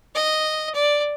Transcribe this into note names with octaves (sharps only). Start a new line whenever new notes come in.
D#5
D5